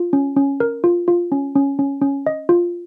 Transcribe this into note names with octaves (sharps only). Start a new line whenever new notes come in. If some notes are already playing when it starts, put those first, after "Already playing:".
Already playing: F4
C#4
C#4
A#4
F4
F4
C#4
C#4
C#4
C#4
D#5
F4